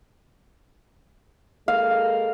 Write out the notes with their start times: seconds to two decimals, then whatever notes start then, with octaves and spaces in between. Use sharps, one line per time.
1.68 G#3 A#3 A4 F5